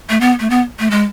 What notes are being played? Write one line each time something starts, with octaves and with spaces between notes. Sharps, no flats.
A3
B3
A3
B3
A3
G#3